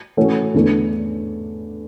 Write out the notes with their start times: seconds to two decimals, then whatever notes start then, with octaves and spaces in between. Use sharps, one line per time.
0.17 E3 A3 C#4 F#4
0.54 E2 D3 A3 D4